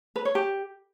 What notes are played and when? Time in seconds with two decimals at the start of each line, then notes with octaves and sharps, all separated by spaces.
0.16 B4
0.25 C#5
0.35 G4